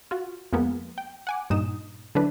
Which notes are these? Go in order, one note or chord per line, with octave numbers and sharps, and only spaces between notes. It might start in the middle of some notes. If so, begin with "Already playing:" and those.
F4 F#4
F2 F3 G#3 A#3 B3
G5
F#5 G#5 D6
G2 A#2 D#4 D#6 E7
D3 F#3 D4 E4 B4